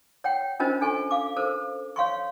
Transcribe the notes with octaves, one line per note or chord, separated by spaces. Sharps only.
C#5 F#5 G5
C#4 D4 F4 A#4 C5 D#5
D4 A4 G#5 C#6
F5 D6
A4 A#4 C5
C#5 F5 C6 C#6